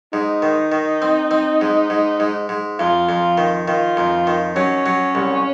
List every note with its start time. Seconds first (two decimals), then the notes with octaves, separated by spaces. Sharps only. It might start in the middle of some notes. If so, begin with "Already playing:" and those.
0.13 G#2 D#4
0.42 D#3
0.72 D#3
1.02 C4
1.31 C4
1.61 G#2
1.90 G#2
2.20 G#2
2.49 G#2
2.79 F2 F4
3.09 F2
3.38 D#3
3.68 D#3 F4
3.97 F2
4.27 D#3
4.56 F#3 C#4
4.86 F#3
5.15 C2